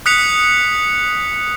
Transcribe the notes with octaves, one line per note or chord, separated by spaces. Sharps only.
D#6 F#6 B6 C#7 F7